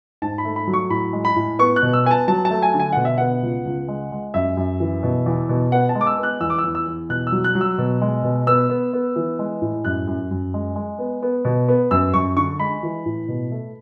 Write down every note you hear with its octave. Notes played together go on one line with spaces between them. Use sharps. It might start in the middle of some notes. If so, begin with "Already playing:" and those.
G#2 A5
B5
A3
B5
F#3
C#6
A2 B5
G#3
B5
A2
B3 C#6
F#6
B2
E6
B3 G#5
A5
F#3 A5
A5
A3
G#5
D3
G#5
B2 F#5
E5
B3 F#5
C#2
C#2
G#3
G#3
F#2 E5
F#2
E3
B2
E2
B2
B3 F#5
A5
G#3
D6
E6
B3
F#6
E2 E6
D6
E6
E2
E6
E2
B2 F#6
E6
F#3
F#6
F#3
E6
B2
G#3
B2
B3 E6
B3
B3
E3
G#3
A2
F#2 F#6
F#2
F#2
G#3
G#3
B3
B3
B2
B3
F#2 E6
F#2 C#6
D3 C#6
G#3 B5
E3
A2
B2
A3